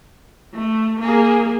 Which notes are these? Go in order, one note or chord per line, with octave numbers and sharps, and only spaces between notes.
A3
A#3 G#4